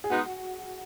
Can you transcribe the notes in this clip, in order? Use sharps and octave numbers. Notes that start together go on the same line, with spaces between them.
G#4
G#3 B3 D#4 F#4